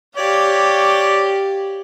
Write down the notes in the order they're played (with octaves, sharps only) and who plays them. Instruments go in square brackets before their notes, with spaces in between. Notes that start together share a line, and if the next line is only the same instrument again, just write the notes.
[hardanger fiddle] G4 F5 [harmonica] C#5 D5